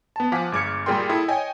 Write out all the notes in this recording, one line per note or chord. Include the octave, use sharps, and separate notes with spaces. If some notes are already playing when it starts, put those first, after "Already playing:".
B3 A5
F3 F5 F#5 G#5 D6 B6
G1 G#3 D6 F6 G#6 C#7
A#2 G3 G#4 A#4 G5 C6
E4 A4 D#6
C#5 D#5 G5 G#5